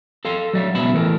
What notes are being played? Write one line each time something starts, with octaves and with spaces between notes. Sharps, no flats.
A4 F5 C6
F#3 D5 E5
C#2 B2 E5 B5
E3 A3 A#4